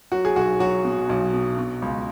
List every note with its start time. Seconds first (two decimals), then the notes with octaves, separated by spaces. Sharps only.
0.12 F#3 F#4
0.25 G#4
0.36 B1 F#4
0.60 F#3 F#4
0.85 B2
1.09 B1
1.33 B2
1.58 B2
1.82 C#2